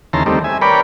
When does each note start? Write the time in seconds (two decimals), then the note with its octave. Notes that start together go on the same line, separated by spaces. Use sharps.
0.13 D#2 C#3 E3 A5 A#5 C6
0.26 D#3 G3 A3 C4
0.44 E5 G#5
0.62 A#4 B4 C#5 D5 G5 B5